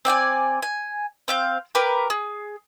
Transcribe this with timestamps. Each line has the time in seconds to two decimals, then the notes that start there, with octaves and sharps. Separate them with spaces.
0.05 C4 D5 G5 G#5
0.62 G#5
1.28 C4 F5 G6
1.75 G4 A#4 B4
2.10 G#4